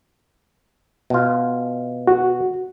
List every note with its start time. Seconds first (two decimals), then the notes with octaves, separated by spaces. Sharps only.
1.10 B2 F4
2.07 F#4